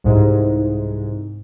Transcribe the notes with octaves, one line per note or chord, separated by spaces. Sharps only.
C2 G#2